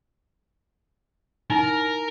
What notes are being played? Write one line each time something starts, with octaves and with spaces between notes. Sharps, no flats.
D#4 E4 A#4